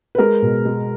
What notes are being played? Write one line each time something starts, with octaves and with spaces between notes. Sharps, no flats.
B4
G#3 A#4
B2
G#3